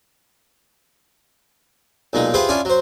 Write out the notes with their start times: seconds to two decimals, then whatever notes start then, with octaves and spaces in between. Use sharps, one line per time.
2.13 B1 A#2 G#3 D#4
2.34 F4 G4 G#4 B4 C5 E5
2.49 C#4 D4 E4 F4 G#5
2.65 F#3 C5